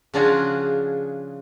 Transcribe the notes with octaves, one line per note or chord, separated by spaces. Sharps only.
C#3 F3 D4 F4 F#4 G#4